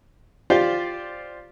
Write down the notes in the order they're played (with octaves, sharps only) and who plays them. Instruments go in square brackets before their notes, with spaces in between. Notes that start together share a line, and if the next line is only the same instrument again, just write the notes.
[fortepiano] F4 G4 C5 D5 F5